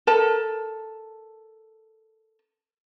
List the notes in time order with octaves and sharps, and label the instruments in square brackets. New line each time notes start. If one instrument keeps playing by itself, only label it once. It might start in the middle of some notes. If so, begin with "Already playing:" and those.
[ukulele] A4 A#4 A5